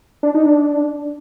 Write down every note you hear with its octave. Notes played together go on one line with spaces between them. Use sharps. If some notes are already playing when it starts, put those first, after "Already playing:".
D4
D#4
D4